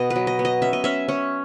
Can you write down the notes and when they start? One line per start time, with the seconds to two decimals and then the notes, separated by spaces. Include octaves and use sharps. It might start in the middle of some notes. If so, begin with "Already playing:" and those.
Already playing: B2 B3 D#5
0.10 B4
0.16 F#3
0.27 D#5
0.39 B3
0.45 D#5
0.62 C#4 E5
0.73 D#5
0.84 C#4 E5
1.08 C#4